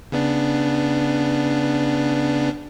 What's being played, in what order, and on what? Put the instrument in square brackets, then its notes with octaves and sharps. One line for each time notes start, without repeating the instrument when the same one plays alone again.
[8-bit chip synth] C#3 B3 D4